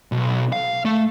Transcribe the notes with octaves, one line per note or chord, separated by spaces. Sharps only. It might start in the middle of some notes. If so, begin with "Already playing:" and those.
B1
F5
A3